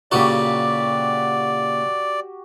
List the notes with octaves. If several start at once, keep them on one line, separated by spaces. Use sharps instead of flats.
A#2 C#3 F#4 G4 A4 D5